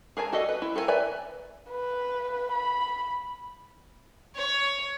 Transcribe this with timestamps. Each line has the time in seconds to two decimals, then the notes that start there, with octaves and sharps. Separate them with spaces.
0.17 G#4 A#4 G#5 A5
0.33 F#4 A4 D5 D#5
0.49 B4
0.62 E4
0.75 A4 A#4 C5 G#5
0.88 A#4 B4 D5 E5 G#5
1.70 B4
2.52 B5
4.35 C#5